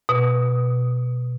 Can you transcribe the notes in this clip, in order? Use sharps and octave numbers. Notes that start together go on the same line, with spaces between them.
B2